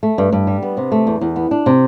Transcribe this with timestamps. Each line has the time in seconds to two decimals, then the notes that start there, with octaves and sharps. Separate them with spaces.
0.03 A3
0.18 G2
0.33 G2
0.47 G3
0.62 B3
0.77 C3
0.92 A3
1.07 E2
1.21 E2
1.36 B3
1.51 D4
1.66 C3